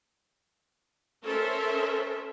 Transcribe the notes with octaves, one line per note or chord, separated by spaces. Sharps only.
C#4 A4 A#4 C5 E5